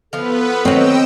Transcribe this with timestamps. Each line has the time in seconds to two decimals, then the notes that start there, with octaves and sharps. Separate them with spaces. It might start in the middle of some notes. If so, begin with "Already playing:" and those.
0.13 F3 B3 F4 A4 B4
0.65 D#3 F#3 C4 C#5 D#5 G5 E6